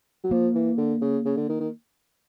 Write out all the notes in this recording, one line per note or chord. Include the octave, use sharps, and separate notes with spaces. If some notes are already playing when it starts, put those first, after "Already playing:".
F#3
F3 A#3
E3
D3
C#3
C#3
D3
D#3
D#3